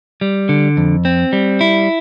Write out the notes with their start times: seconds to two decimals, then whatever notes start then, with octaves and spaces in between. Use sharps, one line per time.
0.21 G3
0.49 D3
0.77 F2
1.05 C4
1.33 G3
1.61 E4